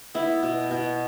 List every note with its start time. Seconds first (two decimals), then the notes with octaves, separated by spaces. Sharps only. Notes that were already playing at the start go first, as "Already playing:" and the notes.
0.14 B3 E4
0.43 B2
0.71 B2